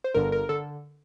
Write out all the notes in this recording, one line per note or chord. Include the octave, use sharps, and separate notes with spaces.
C5
G1 G2 D3 A#4
A#4
D3 A4